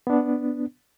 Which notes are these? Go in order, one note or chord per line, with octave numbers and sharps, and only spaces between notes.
B3 D4